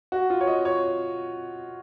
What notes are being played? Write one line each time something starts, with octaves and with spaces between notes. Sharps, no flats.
F#4
F4
C#5
D#5
C#5